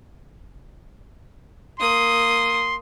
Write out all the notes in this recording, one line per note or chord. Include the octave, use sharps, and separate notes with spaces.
A#3 C6 D#6